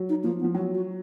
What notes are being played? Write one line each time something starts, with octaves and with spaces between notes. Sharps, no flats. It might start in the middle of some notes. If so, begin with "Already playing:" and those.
Already playing: F#3
D#4
F3 A#3
B3
F3
F#3 F#4
F#4